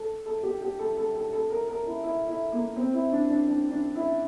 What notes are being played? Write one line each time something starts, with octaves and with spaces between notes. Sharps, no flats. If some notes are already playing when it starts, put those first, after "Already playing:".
Already playing: A4
A4
G4
G4
A4
A4
A4
A4
A#4
A#4
E4
E4
E4
A#3
C4
E4
D4
D4
D4
D4
E4